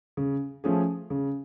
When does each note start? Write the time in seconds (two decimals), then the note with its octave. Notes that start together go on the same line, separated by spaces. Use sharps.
0.17 C#3
0.64 F3 A3 C#4 G#4
1.10 C#3